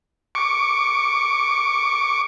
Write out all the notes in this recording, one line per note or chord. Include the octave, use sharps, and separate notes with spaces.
C#6 D6